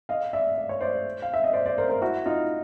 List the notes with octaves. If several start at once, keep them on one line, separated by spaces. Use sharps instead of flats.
D#5 F5
D5 E5
D5
C#5
C5 D5
F5
E5
D#5
C5 D5
C5 D5
A#4 C5
A#4 C5
E4 F#4
D#4 F4